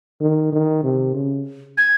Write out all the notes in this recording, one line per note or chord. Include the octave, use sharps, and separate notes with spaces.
D#3
D#3
C3
C#3
G#6